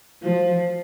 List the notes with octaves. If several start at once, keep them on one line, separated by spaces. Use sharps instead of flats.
F3